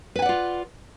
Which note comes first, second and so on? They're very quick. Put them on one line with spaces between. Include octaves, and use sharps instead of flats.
B4 G#5 F#5 D5 F4